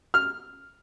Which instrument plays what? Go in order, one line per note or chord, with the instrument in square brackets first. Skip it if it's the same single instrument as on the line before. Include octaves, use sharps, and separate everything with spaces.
[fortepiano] F6